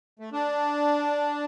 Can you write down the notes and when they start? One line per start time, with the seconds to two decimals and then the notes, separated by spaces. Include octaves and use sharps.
0.19 A3
0.33 D4